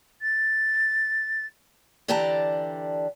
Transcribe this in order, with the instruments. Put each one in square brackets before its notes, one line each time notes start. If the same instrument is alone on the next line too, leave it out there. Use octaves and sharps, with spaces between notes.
[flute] A6
[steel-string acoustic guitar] D3 E3 G4 D5 A5 A#5